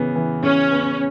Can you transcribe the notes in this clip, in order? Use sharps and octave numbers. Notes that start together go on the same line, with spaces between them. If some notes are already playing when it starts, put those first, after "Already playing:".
Already playing: C#3 E3 B3
E3
C#3 C#4
B3